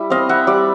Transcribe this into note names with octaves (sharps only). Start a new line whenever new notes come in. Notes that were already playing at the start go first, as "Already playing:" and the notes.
Already playing: G3 E4
C4 D#5 F5
E5 F#5
G3 D5 E5